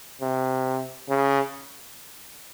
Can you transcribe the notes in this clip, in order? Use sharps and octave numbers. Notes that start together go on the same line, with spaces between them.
C3
C#3